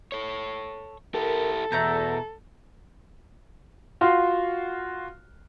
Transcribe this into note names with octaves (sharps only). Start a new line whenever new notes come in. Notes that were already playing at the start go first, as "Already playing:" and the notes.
A4 C#5
E4 G4 A4 A#4
E2 B2 A3 A#5 G6
F4 F#4 C6